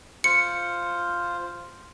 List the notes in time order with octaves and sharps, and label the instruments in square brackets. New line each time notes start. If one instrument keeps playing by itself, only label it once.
[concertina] F4 C5 [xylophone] C#7